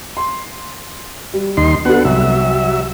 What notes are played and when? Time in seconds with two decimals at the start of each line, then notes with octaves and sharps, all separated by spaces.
0.17 C6
1.34 G3
1.57 D#2 D#4 C6
1.85 B3 D4 F#4 A4 F#5
2.05 C2 F#3 E5